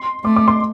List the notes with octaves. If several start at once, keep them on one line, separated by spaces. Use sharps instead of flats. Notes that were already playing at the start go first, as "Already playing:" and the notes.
Already playing: C6
A3 D6
D6
C6